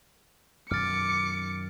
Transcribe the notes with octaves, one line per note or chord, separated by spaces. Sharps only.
F#2 B2 D#3 D6 F6 A6 C#7